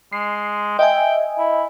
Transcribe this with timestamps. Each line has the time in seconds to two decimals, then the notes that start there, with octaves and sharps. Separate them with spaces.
0.13 G#3 C7
0.79 D#5 E5 G5 G#5
1.39 E4